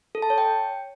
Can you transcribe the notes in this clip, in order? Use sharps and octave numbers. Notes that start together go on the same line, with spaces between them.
A4
A5
C#5
G5